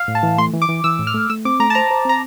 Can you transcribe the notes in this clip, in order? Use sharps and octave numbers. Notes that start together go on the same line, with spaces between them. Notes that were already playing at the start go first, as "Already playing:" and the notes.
Already playing: F5
A2
A5
E3
A3 C6
E3
D6
E3
E3 E6
A2
F6
A3
A3 E6
C4 D6
A3 A#5
A5
C5 A#5
C5
C4 A#5